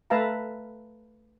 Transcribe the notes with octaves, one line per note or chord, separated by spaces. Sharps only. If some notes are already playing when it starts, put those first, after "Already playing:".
A3 B4 E5 F5 A5 A#5